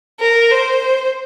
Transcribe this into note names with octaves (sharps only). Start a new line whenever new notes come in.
A#4
C5